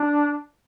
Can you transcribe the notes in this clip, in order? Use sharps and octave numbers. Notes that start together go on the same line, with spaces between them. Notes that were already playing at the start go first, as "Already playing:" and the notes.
Already playing: D4